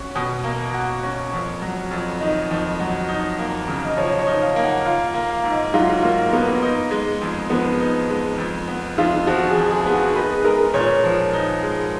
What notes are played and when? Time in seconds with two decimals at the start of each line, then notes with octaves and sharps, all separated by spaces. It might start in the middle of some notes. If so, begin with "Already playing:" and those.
Already playing: C#4 F#4
0.15 B2
0.44 A#3
0.74 F#4
1.03 C#4
1.33 F2
1.62 F#3
1.91 F2
2.20 D#3 D#5
2.51 F2
2.80 F#3
3.08 D#4
3.39 A#3
3.68 C#3
3.85 D#5
3.97 F3 C#5
4.19 C#5
4.27 D#4
4.42 F5
4.56 A#3
4.63 F#5
4.85 F4 F5
5.08 F5
5.14 A#3
5.30 F5
5.44 G#2
5.51 D#5
5.74 F#3 F4
6.03 A#3 F4
6.32 A#3 B3
6.62 D#4
6.91 G#3
7.21 F2
7.50 F3 B3
7.80 D#4
8.10 G#3
8.38 F2
8.68 B3
8.98 F2 F4
9.27 F3 F#4
9.49 G#4
9.57 F2
9.71 G#4
9.86 B3
9.93 F#4
10.15 D#4 B4
10.35 G#4
10.45 G#3 A#4
10.74 A#2 C#5
11.04 F3
11.33 D#4
11.63 G#3